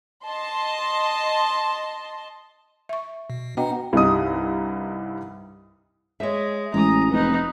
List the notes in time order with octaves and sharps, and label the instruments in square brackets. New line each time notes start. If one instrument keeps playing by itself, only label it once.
[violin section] D#5 A5 C6
[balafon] E5 C#6
[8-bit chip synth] B2
[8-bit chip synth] B3 F#5 [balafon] D4 F#4 D#5 [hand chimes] B4 G5 A#5
[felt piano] C2 G2 G3 D#4 D#6
[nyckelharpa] G#3 [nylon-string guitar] C#5 E5
[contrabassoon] A1 [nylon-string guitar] G#3 [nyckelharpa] A#5 D#6
[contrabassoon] F1 [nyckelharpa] B3 D#4